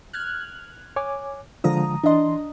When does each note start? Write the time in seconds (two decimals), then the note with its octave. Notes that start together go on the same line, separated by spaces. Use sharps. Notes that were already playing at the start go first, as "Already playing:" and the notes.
0.13 F6 F#6 G#6
0.96 C#5 G#5 D6
1.64 D3 F3 G#3 A#5 D#6
2.04 E3 D4 D#5 C6